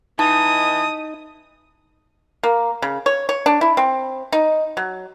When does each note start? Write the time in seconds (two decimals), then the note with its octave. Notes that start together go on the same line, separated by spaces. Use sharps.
0.19 E3 D#4 A5 D#6
2.43 A#3
2.82 C#3
3.06 C#5
3.29 C#5
3.46 D4
3.61 E4
3.77 C4
4.32 D#4
4.77 F#3